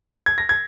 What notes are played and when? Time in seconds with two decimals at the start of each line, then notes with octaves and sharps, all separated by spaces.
0.26 G#6
0.38 A#6
0.49 G#6